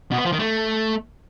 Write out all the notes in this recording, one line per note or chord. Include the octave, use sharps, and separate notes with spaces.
B2
B3
F3
D#3
A3